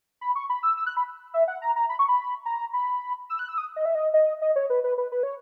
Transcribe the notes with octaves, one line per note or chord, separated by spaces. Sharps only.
B5
C#6
B5
E6
E6
F#6
B5
E5
F#5
A#5
A#5
B5
C#6
B5
A#5
B5
E6
F#6
E6
D#6
D#5
E5
D#5
D#5
D#5
C#5
B4
B4
B4
B4
C#5